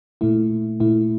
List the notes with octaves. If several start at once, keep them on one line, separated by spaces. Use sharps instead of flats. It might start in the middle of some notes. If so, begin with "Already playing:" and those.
A#2 A3 E4
A#2 A3 E4